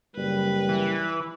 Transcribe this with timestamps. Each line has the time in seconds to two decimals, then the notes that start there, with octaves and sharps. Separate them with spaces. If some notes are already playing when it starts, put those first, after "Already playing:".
0.16 F#1 G3 B4
0.69 E3